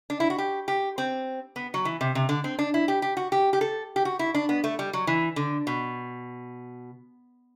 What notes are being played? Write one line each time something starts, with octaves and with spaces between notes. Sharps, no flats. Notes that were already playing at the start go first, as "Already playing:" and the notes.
D4
E4
F#4
G4
G4
C4
B3
F#3
E3
C3
C3
D3
C4
D4
E4
G4
G4
F#4
G4
G4
A4
G4
F#4
E4
D4
B3
A3
G3
F#3
E3
D3
B2